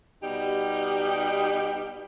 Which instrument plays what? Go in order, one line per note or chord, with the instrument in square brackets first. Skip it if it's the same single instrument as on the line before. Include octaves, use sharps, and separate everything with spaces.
[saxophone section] B2 G3 D#4 G4